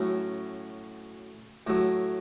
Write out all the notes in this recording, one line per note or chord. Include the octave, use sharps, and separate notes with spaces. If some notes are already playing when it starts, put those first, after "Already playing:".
Already playing: A2 F#3 C#4
A2 F#3